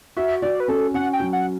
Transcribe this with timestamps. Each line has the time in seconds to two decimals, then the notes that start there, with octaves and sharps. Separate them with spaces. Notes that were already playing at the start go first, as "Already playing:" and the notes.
0.17 F#4 E5
0.42 F#4 D5
0.60 B4
0.68 C#4 A4
0.94 C#4 F#5
1.13 G5
1.20 F#3
1.33 F#5